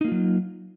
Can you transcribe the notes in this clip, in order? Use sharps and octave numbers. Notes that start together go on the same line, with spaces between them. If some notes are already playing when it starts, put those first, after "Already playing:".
F#3 A#3 D#4 F4